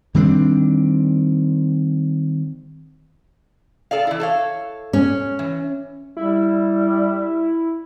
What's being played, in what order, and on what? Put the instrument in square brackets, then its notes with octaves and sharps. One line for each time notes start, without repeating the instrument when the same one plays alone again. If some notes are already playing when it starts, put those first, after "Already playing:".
[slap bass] D#3 G3 C4 D4
[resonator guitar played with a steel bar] A4 D5 F5
E3 E4
A4 C#5 F5
[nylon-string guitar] C#4
[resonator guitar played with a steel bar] E3
[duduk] G3 [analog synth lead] E4